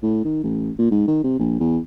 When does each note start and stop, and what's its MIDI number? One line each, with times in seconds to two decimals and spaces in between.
0.02 0.21 45
0.24 0.39 51
0.44 0.71 33
0.79 0.90 46
0.91 1.02 44
1.07 1.20 51
1.24 1.39 48
1.39 1.57 34
1.60 1.78 40